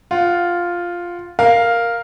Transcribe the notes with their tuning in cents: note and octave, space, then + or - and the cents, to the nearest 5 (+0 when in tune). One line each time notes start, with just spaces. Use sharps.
F4 +0 F#5 +20
A#4 +0 F5 +0